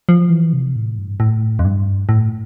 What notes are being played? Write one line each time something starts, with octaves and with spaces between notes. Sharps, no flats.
F3
E3
C3
A2
G2
A2
F2
G2
A2